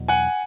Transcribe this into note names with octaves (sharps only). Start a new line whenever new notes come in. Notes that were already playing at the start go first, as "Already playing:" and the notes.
Already playing: E2 B2 F#3
F#5 G#5